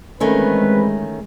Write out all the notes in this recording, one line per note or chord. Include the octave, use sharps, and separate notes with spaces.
D#3 E3 G#3 A3 C4 C#4 B4